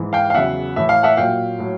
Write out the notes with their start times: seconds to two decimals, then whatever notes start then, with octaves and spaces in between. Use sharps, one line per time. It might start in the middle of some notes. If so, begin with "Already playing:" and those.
Already playing: G#2 E3
0.13 F5 G5
0.30 F5
0.34 E2 C#3 F#3 E5 F#5
0.76 A2 E3 E5
0.89 F5
1.03 E5 F#5
1.17 A#2 F#3 F5 G5
1.59 A2 F#3